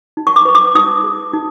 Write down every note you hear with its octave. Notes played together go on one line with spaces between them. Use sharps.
D#4
C#6
D6
B4
D6
D#4 D#6
G#4
D#4